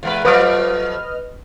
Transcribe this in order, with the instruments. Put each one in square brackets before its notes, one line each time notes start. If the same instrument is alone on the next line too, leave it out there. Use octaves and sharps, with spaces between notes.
[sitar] E2 G#3 B4
[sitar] F3 F#3 A3 [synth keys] B4 D#5 F6